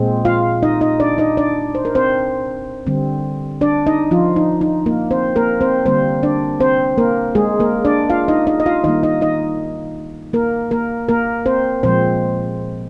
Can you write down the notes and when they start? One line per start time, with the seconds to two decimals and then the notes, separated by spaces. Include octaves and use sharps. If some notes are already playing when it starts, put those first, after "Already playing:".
Already playing: A#2 G#3 C4
0.25 F4 F5
0.63 D#4 D#5
0.81 D#4 D#5
1.00 D4 D5
1.18 D#4 D#5
1.37 D4 D5
1.75 C5
1.85 A#4
1.95 C4 C5
2.86 D3 G3 C4
3.61 D4 D5
3.87 D#4 D#5
4.11 F3 F4
4.36 D#4
4.61 D#4
4.86 A#3 A#4
5.11 C4 C5
5.36 A#3 A#4
5.61 C4 C5
5.86 D3 G3 A#3 C4 C5
6.23 D4 D5
6.60 C4 C5
6.98 A#3 A#4
7.35 G#3 G#4
7.60 A#3 A#4
7.85 D4 D5
8.10 F4 F5
8.28 D#4 D#5
8.47 D#4 D#5
8.60 D#5
8.66 F4 F5
8.84 D#3 G3 A#3 D#4 D#5
9.03 D#4 D#5
9.21 D#4 D#5
10.33 A#3 A#4
10.71 A#3 A#4
11.09 A#3 A#4
11.46 C4 C5
11.83 A#2 F3 G#3 C4 C5